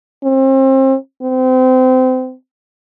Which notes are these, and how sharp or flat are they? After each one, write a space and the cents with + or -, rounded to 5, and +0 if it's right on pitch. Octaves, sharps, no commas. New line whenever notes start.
C4 +35
C4 -30